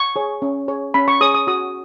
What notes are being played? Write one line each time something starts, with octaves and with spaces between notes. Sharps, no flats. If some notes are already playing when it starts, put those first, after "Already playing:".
Already playing: C#6
G#4 C#5
C#4
G#4 C#5
C#4 B5
C#6
G#4 C#5 D#6
D#6
F#4 D#6